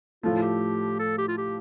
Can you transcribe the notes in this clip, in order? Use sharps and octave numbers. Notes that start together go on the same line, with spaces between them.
A2 F3 A3 F4
F4
G4
A4
G4
F4
G4